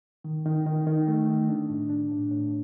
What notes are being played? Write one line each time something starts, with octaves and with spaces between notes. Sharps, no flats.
D#3
D#3
D#3
D#3
A3
D#3
D4
A2
D4
A2
A2